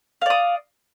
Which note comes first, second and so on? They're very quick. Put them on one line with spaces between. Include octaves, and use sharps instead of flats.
F5 D5 D#6